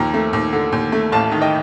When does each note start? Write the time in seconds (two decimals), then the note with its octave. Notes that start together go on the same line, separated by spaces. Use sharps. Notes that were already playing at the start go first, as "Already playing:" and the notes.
Already playing: D#2 F3 G5 A#5
0.14 A3
0.33 D#2
0.53 D3
0.72 D#2
0.92 A3
1.12 A1 F5 A5
1.32 D#3
1.41 D#5 G5